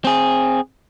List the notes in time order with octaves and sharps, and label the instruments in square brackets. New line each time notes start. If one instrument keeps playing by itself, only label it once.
[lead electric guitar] C4 G#4